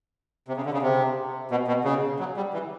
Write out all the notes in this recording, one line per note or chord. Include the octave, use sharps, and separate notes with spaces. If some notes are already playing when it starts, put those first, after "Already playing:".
C3
C#3
D3
C#3
C3
B2
B2
C#3
F#3
G3
E3